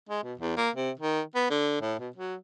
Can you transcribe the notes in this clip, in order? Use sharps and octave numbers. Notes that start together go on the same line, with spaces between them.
G#3
B2
E2
A#3
C3
D#3
B3
D3
A2
B2
F#3